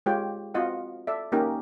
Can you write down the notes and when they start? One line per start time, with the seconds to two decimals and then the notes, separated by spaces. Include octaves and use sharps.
0.06 G#3 F4 G4 C#5 G5
0.54 C4 F4 F#4 D#5 F5 F#5
1.07 A4 D5 E5
1.32 A#3 C#4 D#4 G4 A#4